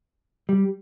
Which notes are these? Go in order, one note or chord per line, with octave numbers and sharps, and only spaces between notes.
G3